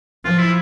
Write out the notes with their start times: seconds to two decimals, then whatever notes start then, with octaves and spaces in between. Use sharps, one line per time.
0.24 F3 F4
0.38 E4